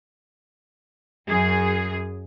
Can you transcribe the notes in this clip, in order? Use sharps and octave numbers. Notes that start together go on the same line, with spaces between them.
F#2 G#4